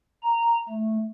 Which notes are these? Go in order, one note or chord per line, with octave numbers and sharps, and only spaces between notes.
A#5
A3